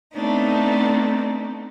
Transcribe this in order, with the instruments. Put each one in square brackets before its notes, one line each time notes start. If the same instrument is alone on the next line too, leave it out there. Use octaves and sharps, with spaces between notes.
[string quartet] A3 B3 C4 D4 D#4